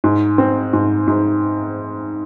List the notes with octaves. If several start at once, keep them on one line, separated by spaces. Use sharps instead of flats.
G#2
C4
G#2
G#2